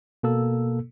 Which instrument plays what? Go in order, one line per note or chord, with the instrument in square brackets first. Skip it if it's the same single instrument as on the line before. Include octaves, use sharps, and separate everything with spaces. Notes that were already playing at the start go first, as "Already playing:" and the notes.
[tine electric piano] B2 A#3 A4 E6